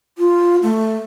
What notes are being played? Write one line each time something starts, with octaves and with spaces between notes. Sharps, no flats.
F4
A3